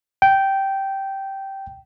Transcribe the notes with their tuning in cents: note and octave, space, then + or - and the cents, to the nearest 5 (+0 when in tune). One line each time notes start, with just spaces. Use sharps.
G5 -10